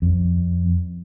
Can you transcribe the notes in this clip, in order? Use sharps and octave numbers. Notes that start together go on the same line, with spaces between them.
F2